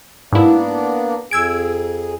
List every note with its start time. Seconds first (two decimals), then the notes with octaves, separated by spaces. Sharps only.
0.33 G#2 A#3 B3 D4 E4
1.31 F2 G#4 E6 G#6 D7